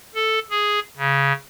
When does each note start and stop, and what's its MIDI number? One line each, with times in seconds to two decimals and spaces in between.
0.14 0.39 69
0.50 0.79 68
0.98 1.33 49